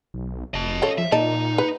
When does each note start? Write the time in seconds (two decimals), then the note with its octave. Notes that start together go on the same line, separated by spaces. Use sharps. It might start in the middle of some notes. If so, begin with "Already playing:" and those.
0.14 B1
0.54 F1 D#5 A5
0.82 C#3 A4 C#5
0.98 F3 E5
1.12 A#2 D#4 D5 D#5 A5
1.58 B4